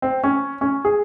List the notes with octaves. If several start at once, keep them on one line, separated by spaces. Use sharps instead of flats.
C4
C#4
C#4
G#4